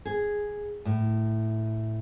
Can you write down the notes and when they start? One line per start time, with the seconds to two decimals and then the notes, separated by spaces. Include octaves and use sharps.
0.05 G#4
0.85 A2